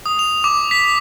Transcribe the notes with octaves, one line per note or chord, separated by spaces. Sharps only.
D#6
F7
D6
B6